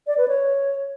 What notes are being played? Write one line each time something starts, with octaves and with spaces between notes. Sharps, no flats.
D5
B4
C#5